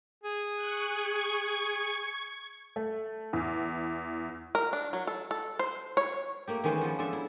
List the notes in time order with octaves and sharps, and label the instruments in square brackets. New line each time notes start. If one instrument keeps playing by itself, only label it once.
[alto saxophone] G#4
[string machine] C#6 F#6
C#6 G#6
[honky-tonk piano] A3
E2
[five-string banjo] A#4
D4
F#3
A4
A4
C5
C#5
[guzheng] A3 A#3 G4
D#3 E3 G#3 C#4 B4 C5
F3 B3 F4 F#4
G#3 D4 F4 A4 E5
E4